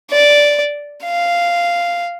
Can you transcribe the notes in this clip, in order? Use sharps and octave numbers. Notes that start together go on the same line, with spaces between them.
D5
F5